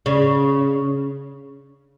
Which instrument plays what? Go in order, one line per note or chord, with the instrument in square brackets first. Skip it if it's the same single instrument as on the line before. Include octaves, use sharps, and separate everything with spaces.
[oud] C#3